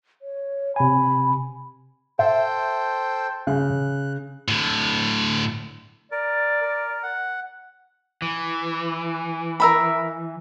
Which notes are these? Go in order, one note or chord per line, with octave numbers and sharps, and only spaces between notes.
C#5
C3 G#5 B5
A4 C5 E5 G5
C#3 F#6
A2 D3
A#4 D5
A#4
F#5
E3
A#4 E5 B5